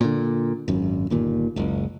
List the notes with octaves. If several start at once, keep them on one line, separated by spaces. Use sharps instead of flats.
A#2 D3
G#1 F#2
G1 D#2 A#2
F#1 C#2